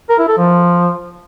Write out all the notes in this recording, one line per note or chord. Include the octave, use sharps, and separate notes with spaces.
A#4
E4
A4
F3